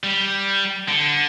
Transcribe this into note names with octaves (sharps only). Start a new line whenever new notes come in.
G3
D3